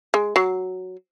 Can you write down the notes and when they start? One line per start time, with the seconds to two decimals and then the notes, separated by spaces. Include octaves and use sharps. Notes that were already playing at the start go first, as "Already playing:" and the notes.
0.14 G#3
0.36 F#3